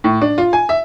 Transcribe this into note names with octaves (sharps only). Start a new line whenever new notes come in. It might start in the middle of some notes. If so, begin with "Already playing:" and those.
A2
D4
F4
G#5
E5